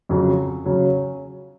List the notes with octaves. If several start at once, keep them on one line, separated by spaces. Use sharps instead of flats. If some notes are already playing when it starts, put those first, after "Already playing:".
F2 C#3 F#3
C#3 F#3